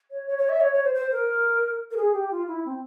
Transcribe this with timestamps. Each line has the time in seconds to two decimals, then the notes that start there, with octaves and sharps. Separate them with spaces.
0.11 C#5
0.27 C#5
0.38 C#5
0.49 E5
0.61 C#5
0.73 C#5
0.84 C5
0.95 C5
1.12 A#4
1.91 A#4
1.97 G#4
2.13 G4
2.31 F4
2.48 E4
2.66 C4